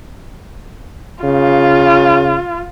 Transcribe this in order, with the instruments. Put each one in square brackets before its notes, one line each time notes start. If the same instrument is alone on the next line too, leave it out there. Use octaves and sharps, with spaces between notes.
[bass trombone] C#3 [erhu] F4